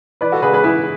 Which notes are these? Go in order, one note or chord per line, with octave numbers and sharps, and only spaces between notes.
E3 B4 D5
F#4 A4
C#3 G#4 B4
G#4 B4
E3 E4 G#4